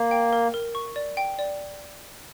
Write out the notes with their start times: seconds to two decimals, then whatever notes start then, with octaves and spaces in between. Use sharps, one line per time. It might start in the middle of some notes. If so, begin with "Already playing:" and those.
Already playing: A#3
0.11 G5
0.33 A#4
0.54 A#4
0.75 C#6
0.96 D5
1.17 G5
1.39 D5